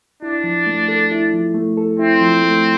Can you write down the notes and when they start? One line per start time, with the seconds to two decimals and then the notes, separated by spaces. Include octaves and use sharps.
0.22 D4 E4
0.44 F3
0.66 A3
0.88 A4
1.11 E4
1.34 F3
1.55 A3
1.77 A4
1.99 C4 E4
2.21 F3
2.43 A3